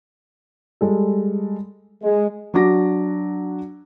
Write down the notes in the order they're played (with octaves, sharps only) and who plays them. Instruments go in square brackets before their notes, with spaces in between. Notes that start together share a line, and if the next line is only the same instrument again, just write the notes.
[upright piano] G3 G#3 A4
[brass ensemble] G#3
[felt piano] F#3 D4 F#4 D6 A#6